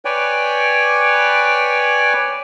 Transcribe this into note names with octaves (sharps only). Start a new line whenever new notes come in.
B4 C#5 D5 G5 G#5